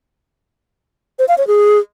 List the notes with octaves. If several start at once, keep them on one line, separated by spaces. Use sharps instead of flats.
C5
F5
C#5
G#4